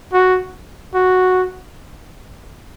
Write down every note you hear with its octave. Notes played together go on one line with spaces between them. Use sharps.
F#4
F#4